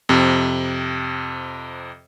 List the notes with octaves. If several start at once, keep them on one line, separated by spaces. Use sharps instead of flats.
F2 C3